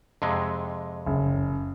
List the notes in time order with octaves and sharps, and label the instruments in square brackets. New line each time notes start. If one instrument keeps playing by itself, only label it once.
[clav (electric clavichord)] F2 C3 G#3
[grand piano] F#1